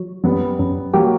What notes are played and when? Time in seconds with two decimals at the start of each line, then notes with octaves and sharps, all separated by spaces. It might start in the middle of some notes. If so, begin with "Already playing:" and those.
Already playing: F#3
0.24 F#2 G3 B3
0.59 F#2
0.94 F#3 A#3 G4